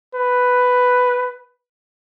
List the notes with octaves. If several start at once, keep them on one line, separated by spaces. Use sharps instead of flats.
B4